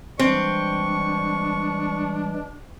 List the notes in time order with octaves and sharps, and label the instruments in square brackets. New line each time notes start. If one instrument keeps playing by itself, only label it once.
[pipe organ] E3 G3 G#3 [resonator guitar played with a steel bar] C4 [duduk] D4 [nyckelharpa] C#6